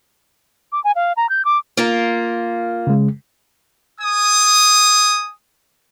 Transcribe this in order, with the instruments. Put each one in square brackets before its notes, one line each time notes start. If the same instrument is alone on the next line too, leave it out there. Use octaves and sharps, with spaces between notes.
[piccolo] D6
G#5
F5
A#5
G6
D6
[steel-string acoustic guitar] A#3 F4 A#4
[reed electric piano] C#3 G#3
[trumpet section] G#5 D#6